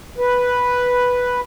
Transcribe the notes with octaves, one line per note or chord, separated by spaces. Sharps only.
B4